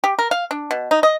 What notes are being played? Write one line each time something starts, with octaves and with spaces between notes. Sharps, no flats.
G4
A#4
F5
D4
B2
D#4
D#5